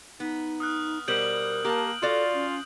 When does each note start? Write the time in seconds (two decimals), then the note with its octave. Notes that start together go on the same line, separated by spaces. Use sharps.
0.20 B3 D#4
0.60 D#6 F6 F#6
1.08 B2 G3 A#4 C5 G6 D7 F#7
1.65 A#3 G4 A5
2.03 F4 F#4 A4 D5
2.34 C#4